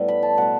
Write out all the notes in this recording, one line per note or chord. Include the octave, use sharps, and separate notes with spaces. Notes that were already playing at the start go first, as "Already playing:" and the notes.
Already playing: A2 G3 B3
B5
A5
B2 A3 F#5